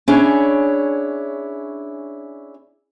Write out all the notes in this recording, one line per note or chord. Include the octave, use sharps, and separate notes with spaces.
C#4 D4 E4 G#4 C#5